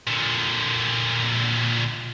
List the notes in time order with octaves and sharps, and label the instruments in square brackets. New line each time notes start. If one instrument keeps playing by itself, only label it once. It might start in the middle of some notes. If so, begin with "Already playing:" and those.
[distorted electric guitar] A#2 D3